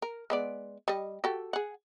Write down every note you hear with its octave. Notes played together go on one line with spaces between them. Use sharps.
A#4
G#3 B3 D5
G3 D#5
F#4 G4 A4
G#4 F#5